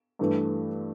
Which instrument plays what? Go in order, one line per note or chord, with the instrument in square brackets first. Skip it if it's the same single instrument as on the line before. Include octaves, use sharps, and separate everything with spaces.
[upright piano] G2 E3 A3